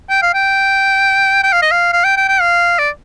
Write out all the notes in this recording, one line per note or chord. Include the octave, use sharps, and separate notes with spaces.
G5
F5
G5
G5
F5
D#5
F5
F5
G5
G5
G5
F5
D5